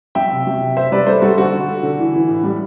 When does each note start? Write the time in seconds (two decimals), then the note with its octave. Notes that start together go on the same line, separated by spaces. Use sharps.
0.15 F#3 E5 G5
0.31 C3
0.47 F#3
0.62 C3
0.77 C3 C5 E5
0.92 G3 B4 D5
1.07 G3 A4 C5
1.22 G3 F#4 A4
1.38 D3 F#4
1.53 D3
1.68 A3
1.83 D3
1.99 E3
2.14 E3
2.29 A2
2.44 G3